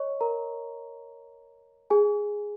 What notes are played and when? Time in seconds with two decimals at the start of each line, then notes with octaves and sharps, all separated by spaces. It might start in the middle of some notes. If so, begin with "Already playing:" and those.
Already playing: C#5 D#5 C#6
0.21 A#4 A#5
1.90 G#4 G#5